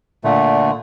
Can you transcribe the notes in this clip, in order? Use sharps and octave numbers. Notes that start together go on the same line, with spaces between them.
A#2 D3 A3